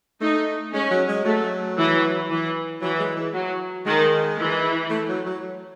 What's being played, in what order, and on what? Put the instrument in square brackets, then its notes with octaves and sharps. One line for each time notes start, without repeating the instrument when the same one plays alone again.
[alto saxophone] A3 [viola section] D#4
[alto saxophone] G#3 [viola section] C#4
[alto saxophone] F#3
G#3
[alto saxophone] F#3 [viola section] A3
[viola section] E3
E3
[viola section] E3 [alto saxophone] F#3
[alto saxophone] G#3
E3
[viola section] F#3
[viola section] D#3 [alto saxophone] G#3
[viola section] E3
[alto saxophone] A3
F#3
F#3